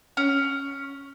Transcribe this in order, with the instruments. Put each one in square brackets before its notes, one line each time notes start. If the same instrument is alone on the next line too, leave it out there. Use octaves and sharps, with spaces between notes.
[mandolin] C#4